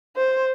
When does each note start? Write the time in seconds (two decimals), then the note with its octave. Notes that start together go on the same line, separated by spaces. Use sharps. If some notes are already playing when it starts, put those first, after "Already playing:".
0.16 C5